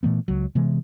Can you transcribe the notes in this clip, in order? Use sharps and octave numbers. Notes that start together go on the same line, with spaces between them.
A#2 E3 A3 B3
C#2 F#3
C3 E3 G#3 B3